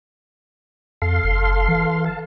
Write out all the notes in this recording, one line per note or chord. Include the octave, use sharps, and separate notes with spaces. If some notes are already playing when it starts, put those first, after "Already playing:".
F2 A4 F5 C6
F#1
E3
F5 A5